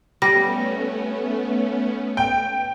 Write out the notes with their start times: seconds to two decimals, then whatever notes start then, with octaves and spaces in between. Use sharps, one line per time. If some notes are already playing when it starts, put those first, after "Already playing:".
0.22 G3 A3 B3 C#4 A#6
2.17 G5